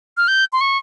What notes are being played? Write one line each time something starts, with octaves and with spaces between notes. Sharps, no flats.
F6
G6
C6
C#6